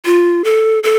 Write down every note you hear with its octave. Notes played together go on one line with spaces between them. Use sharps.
F4
A4
A4